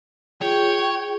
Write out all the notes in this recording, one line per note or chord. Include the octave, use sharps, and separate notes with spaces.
F4 G#4 C#5 G5